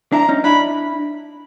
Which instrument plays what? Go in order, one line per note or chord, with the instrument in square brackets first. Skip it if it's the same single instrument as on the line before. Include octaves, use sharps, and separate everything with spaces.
[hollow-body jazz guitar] D4 E4 [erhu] A#5
[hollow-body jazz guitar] C#4 D#4
[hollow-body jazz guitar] D4 E4 [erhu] B5